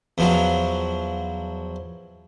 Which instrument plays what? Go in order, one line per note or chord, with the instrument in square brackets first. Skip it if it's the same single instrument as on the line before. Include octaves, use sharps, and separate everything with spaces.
[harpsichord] E2 F3 F#3